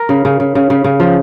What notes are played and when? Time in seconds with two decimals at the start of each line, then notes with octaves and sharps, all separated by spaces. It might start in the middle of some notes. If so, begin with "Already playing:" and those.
Already playing: A#4
0.09 C#3
0.25 C#3
0.40 C#3
0.55 C#3
0.70 C#3
0.84 C#3
1.00 F3